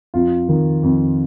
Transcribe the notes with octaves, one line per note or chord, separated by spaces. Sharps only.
F2 F4
D#3
F2